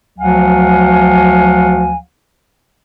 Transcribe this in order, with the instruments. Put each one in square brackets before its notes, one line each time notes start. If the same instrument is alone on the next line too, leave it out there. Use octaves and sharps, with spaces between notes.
[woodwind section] D2 F3 F#3 F5 F#5 G#5